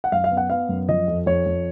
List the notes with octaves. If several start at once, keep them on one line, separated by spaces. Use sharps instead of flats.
F#5
F#2 F5
F5
B3
F#5
B3 F5
F#2
F3 D#5
F2
F2 C#5
F2